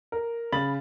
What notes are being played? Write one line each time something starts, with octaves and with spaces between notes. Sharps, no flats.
A#4
C#3 B5 A6 F#7